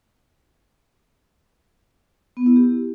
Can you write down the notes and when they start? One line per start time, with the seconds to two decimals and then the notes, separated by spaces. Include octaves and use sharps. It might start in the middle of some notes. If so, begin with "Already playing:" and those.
2.37 B3
2.46 E4
2.56 G4